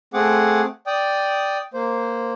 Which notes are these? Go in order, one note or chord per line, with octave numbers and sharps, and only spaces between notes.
A3 C4 G#4 F#5 D6
D5 G5 D#6
A#3 C5